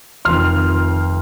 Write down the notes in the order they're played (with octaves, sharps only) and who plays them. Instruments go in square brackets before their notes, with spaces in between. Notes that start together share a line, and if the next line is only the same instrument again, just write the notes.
[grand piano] F1 F2 D#3 C6 F6